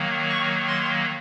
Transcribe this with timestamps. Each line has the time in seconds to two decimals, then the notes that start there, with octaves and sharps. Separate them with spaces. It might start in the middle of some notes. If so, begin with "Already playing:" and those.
Already playing: D#3 F#3 A#3
0.29 C#6
0.68 C6